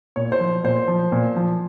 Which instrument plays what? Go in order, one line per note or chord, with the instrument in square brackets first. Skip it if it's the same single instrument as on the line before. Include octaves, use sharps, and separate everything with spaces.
[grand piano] A#2 C#5
C5
F3
A#2 C5
F3
A#2
F3